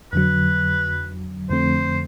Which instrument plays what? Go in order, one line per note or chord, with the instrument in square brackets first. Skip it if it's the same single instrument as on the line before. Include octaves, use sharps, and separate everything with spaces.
[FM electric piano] F2 D3 F#3 [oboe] B4
[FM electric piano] F2 D3 F3 A3 C4 [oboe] C5